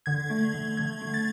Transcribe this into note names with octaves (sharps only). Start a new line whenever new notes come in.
D3 G#6
A3
D3
D3 G#6
A3
A6